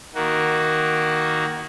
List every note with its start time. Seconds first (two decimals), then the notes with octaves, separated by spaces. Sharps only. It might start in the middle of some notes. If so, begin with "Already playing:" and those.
0.15 D#3 A#3 F#4